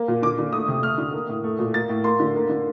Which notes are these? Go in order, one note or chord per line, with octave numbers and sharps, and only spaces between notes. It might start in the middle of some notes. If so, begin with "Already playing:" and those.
Already playing: A#3
A#2
D3 D6
D3
A3 D#6
C3
A3 F6
D3
A#3
A2
A3
A#2
A#3 A6
A2
A#3 C6
D3
A#3
D3